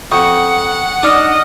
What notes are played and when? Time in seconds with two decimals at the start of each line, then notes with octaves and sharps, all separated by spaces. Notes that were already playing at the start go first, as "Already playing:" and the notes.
0.12 F2 F#5 G5 C#6 D#6
1.03 D4 D#4 D#5 F6